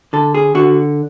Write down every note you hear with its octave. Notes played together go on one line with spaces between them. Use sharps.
D3 A4
G#4
D3 F#4